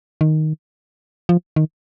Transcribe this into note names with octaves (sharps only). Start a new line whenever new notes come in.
D#3
F3
D#3